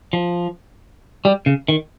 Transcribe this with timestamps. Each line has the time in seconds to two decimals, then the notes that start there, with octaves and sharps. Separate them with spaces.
0.13 F3
1.25 G3
1.46 C#3
1.68 D#3